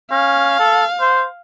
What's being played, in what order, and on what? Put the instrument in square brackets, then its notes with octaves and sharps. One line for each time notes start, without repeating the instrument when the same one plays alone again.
[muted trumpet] C#4 [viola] F5
[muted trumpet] A4
C5